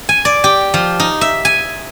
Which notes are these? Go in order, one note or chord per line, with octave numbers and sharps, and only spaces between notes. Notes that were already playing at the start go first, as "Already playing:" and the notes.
G#5
D5
G4
F3
D#4
E5
G#5